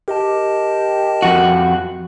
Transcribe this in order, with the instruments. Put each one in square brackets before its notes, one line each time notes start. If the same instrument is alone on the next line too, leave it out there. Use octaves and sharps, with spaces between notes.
[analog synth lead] G4 [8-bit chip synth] A#4 D#5 A5
[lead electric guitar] F2 F#4